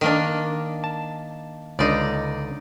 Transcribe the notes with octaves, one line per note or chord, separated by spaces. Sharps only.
D#3 A#3 D4
A5
C#2 D3 D#4 D5